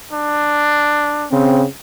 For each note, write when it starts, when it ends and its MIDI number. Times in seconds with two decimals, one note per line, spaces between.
0.13 1.28 62
1.31 1.63 49
1.31 1.63 60